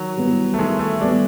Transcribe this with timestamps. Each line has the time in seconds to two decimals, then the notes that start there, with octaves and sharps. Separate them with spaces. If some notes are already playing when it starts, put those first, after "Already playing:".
Already playing: D#3 F#3
0.17 G3 B3
0.54 A3
0.59 D#3 G#3
0.79 A3
1.01 G3 B3 D4